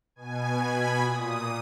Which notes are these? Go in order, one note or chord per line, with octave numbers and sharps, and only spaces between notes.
B2 G#5
B5
A#2 D#6